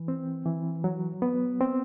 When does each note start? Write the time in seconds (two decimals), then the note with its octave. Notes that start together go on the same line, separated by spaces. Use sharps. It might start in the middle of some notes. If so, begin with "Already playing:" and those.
Already playing: E3
0.08 C4
0.46 E3
0.84 F#3
1.22 B3
1.60 C4